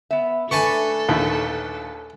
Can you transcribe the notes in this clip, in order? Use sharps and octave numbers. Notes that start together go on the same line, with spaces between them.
B3 E5
A3 D4 A4 B4 G#5 A5 C#6
A#1 D#2 A2 B4 C#5